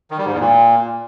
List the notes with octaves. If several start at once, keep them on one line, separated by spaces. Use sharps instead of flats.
D#3
G3
G#2
E2
A#2